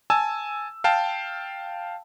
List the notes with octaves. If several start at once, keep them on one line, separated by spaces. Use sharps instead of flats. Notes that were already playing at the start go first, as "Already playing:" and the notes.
G#5 A5 E6
F5 G5 A5